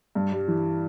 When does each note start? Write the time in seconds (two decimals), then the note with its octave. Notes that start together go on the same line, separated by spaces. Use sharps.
0.15 G2
0.32 G3
0.48 E3